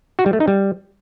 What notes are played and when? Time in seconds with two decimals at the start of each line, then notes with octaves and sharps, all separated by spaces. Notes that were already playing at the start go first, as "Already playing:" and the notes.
0.19 F#4
0.26 G3
0.33 A3
0.40 D#4
0.48 G3